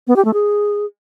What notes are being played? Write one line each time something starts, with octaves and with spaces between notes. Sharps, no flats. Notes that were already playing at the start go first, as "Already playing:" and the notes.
B3
G4
A3
G#4